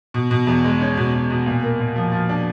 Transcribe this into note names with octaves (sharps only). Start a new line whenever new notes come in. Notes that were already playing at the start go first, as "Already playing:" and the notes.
B2
B2
E2
G#3
C#4
B2
B2
B2
A#2
A#3
A#2
F3
F3
D4